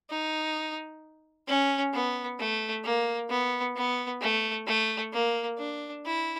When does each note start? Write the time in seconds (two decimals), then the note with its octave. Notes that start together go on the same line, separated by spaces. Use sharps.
0.10 D#4
1.48 C#4
1.93 B3
2.39 A3
2.84 A#3
3.30 B3
3.76 B3
4.21 A3
4.67 A3
5.13 A#3
5.59 D4
6.05 E4